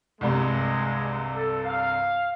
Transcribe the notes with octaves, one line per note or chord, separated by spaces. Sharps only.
C2 G2 C3 G#3
A4
F5